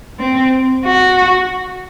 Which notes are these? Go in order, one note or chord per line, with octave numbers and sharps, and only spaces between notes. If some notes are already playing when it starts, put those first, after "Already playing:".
C4
F#4